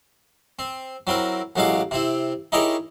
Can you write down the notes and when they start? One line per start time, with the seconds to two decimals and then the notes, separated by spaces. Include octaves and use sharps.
0.59 C4
1.07 F#3 C4 E4 A#4
1.56 A1 F#3 G#3 E4 F5 D6
1.91 C3 C4 E4
2.52 D#4 E4 G4 G#4 A#4 C#5